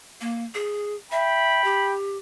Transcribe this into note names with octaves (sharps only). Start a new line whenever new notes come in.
A#3
G#4
E5 G5 B5
G4